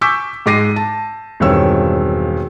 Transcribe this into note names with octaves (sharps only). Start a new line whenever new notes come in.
G#5 C#6 D6 E6 G6 B6
G#2 G#3 D6 A#6 C7 D#7
A5
E1 G2 D#3 C4 C#5 E6